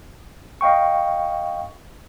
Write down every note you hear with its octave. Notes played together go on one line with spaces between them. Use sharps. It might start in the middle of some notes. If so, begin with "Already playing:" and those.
D#5 F5 G5 C#6